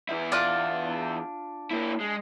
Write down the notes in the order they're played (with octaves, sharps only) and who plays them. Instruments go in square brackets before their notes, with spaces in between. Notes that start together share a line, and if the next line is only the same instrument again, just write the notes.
[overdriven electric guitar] E2 E4
[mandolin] D4 F4 F#6
[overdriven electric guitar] A#3 E4
G#3